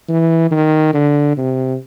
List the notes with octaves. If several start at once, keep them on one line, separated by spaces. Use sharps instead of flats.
E3
D#3
D3
C3